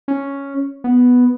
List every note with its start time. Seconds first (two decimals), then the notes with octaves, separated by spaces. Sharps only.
0.08 C#4
0.84 B3